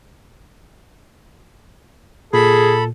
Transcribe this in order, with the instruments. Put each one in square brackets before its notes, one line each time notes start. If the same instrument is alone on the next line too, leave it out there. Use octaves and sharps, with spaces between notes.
[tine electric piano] A#2 [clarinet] G#4 [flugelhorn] A4 [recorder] B5